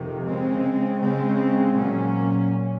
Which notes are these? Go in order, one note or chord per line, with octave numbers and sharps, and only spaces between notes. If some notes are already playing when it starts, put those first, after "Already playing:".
Already playing: F2 C3 D#3
C#3 G#3 C4
C#3 G#3 C4
A#2 F#3 C#4